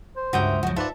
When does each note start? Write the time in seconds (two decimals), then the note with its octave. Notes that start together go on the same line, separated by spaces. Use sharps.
0.17 C5
0.33 C#2 G2 F#4 A#4 E5 D#6 G6
0.63 F#2 F3 F#4
0.76 G#2 F4 A4 B4 D5 E5